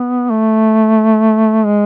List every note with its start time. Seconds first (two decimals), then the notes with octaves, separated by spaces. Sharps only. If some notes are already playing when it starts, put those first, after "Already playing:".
Already playing: B3
0.31 A3
1.65 G#3